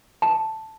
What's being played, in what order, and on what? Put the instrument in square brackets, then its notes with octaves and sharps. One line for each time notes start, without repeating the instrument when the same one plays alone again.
[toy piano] A5